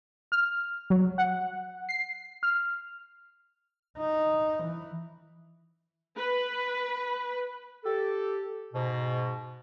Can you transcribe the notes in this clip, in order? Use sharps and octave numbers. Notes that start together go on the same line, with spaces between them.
F6
F#3
F#5
C7
F6
D#4
E3
B4
G4 A4
G#2 B2